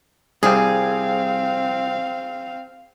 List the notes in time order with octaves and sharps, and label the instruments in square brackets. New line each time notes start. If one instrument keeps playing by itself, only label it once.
[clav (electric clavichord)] C2 G3 [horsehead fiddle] C4 F5 [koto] G#4